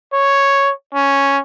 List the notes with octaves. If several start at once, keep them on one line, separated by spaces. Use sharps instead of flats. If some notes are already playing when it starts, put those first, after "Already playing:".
C#5
C#4